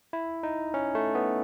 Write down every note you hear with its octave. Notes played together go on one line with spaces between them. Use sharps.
E4
D#4
C#4
A3
B3